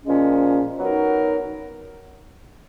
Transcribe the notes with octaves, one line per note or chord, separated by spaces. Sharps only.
A#2 F3 G#3 C#4
F#3 B3 D#4 F#4 A#4